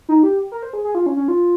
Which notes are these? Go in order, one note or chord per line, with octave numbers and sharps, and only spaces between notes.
D#4
G4
A#4
C5
G#4
G#4
F4
C#4
C#4
F4